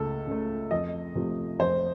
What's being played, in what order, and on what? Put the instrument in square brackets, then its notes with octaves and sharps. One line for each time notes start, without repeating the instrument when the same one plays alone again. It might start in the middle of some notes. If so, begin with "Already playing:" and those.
Already playing: [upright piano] C#2 C#3 A3 A4
C#3 A3
F2 D#5
C3 F3 A3
F2 C5